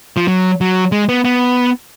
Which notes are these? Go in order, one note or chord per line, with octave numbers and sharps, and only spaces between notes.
F3
F#3
F#3
G#3
B3
B3